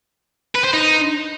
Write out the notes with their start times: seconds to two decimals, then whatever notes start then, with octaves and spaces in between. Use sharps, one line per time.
0.55 B4
0.64 C5
0.73 D#4